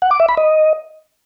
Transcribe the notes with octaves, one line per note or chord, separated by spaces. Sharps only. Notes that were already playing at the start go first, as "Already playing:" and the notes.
F#5
D6
E5
B5
D#5